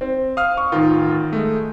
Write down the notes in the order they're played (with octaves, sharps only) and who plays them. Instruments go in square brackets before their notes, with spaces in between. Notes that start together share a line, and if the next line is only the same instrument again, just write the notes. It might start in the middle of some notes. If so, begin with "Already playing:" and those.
[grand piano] C4
[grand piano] F5 [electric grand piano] D#6 F6
[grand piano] C#6
[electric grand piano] A1 F4 [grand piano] D#3
[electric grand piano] G#3 A3